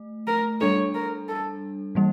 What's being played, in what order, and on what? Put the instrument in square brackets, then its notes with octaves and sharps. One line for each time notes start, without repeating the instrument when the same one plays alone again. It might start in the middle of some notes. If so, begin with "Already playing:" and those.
Already playing: [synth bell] A3
[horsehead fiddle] A#4
[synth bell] G3 D4 A4 [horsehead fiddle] C#5
[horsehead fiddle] A#4
A4
[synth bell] E3 G3 A#3